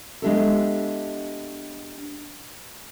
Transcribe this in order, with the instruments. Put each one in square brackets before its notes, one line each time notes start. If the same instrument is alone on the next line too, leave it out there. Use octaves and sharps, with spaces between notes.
[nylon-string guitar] G#3 B3 D4 E4 G4 A4